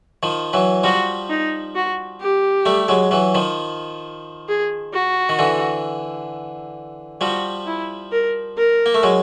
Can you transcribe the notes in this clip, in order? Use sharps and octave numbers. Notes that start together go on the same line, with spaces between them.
D#3 F3
E3 F#3
F3 G3 F#4
D#4
F#4
G4
G3 A3
F#3 G#3
E3 F#3
D#3 F3
G#4
F#4
D#3
D3 E3
F3 G3 F#4
E4
A#4
A#4
A#3
A3
F#3 G#3